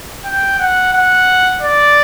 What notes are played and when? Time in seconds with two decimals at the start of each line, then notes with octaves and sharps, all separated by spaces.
0.25 G5
0.59 F#5
0.94 F#5
1.62 D5